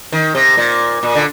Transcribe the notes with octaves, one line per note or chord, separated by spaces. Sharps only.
D#3
C3
A#2
A#2
D3